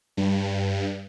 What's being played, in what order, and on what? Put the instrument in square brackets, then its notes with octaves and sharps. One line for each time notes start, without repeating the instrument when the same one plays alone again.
[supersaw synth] G2